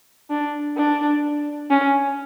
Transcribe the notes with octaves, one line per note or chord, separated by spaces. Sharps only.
D4
D4
C#4